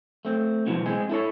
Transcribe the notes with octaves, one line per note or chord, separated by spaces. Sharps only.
A3 C4
C#2 B2 E3 F3
G#3 C4 G#4
E4 A4 C#5